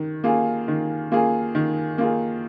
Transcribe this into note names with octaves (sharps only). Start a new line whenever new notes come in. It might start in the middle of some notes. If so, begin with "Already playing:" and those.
Already playing: D#3
A#3 F4 G#4
D#3
A#3 F4 G#4
D#3
A#3 F4 G#4